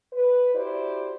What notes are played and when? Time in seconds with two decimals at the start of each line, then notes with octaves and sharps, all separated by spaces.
0.13 B4
0.55 E4 F#4 G4 C5 D5